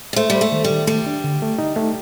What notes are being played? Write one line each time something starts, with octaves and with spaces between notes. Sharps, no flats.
G3
A3 C5
G3
C5
A3
D#3
G3
D#3
G3 A3
D4
D3
A3
D#4
A3